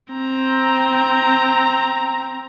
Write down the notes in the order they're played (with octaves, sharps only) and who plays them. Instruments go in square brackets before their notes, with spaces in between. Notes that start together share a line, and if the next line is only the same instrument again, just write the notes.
[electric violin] C4 A#5